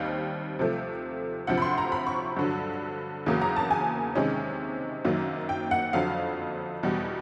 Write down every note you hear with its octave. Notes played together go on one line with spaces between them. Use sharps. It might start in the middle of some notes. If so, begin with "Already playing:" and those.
Already playing: D#2 D#3 G3 C4 F5
C3 F3 A3
D2 C3 F3 F#5
B5
C6
A#5
B5
C#6
G2 D3 F#3
E2 C#3 F#3 A#3
A#5
A5
G#5
C3 D#3 G#3 C#4
F#2 D#3 F#3 A#3
G5
F#5
F2 D3 F#3 F5
E2 B2 G3